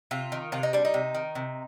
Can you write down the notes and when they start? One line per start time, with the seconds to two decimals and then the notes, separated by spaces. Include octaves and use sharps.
0.11 C3 F4
0.32 D#3
0.52 C3 F4
0.63 D#4
0.73 G3 D4
0.85 D#4
0.94 C3
1.14 D#3
1.35 C3